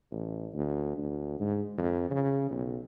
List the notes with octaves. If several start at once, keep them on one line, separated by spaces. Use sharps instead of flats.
A1
D2
D2
G#2
F2
C#3
B1